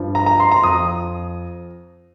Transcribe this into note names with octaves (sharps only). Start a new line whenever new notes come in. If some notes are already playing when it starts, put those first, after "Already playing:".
Already playing: G2 F3
A#5
A#5
C6
A#5
F2 F3 D#6